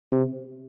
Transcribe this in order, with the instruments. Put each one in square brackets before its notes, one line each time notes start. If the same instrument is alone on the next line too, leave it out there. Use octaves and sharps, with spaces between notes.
[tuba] C3